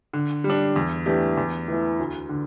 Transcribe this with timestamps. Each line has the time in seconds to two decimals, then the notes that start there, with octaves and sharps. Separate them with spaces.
0.13 D3
0.44 G3
0.50 D4
0.76 E2
1.06 E3 A3 D4 G4
1.37 E2
1.68 E3 A3 E4
1.99 D2
2.29 D3